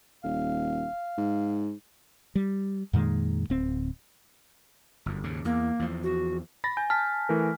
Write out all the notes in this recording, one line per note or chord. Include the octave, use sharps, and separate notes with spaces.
D#1 F5
G#2
G3
F2 A#2 D#3 G#3
D1 C4
G1 F#2
D#2 G#2 C#3
E2 A#3
E2 F3
F#4
B5 A6 A#6
G#5 G6
A5 F6 B6
E3 A3 A#4